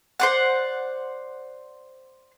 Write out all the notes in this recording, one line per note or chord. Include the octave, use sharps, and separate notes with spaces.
C5 D5 F#5